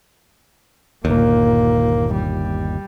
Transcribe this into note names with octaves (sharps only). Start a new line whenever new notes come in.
G1 D#2 A#2 A#3
G3